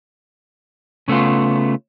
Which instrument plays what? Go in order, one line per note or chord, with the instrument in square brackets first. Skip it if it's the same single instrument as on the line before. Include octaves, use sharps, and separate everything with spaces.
[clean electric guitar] C#3 A3 B3 F4